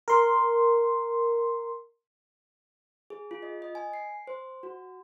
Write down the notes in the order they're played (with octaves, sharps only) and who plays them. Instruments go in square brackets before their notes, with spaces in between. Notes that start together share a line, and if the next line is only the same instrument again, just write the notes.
[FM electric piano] A#4 C6
[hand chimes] G#4
F4
D#5
D#5
G#5
C7
C5
F#4